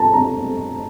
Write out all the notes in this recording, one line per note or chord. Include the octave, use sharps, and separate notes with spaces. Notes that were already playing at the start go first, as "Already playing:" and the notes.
Already playing: A5 A#5
A#5